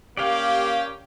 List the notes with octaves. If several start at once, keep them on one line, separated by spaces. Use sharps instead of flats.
A#3 C#4 G4 D5 F5